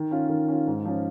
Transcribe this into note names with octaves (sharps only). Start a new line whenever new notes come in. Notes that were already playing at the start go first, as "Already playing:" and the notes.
Already playing: D#3
C#4 F4
D#3
C#4 F4
G#2
F3 C#4 F4